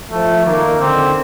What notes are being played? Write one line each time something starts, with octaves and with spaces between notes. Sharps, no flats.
F3 A3
D#3 A#3
D3 C4